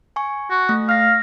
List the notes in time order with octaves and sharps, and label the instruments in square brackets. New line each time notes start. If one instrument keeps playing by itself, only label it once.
[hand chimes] G#5 C#6
[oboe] F#4
[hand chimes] A3
[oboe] F5 [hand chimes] F6 A#6